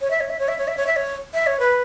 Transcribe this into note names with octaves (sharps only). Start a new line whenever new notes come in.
C#5
E5
C#5
E5
C#5
E5
C#5
E5
C#5
E5
C#5
E5
C#5
B4